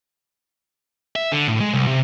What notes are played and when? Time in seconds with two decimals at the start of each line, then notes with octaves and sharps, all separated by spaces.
1.16 E5
1.32 D3
1.48 A2
1.60 G#3
1.74 C2
1.87 C3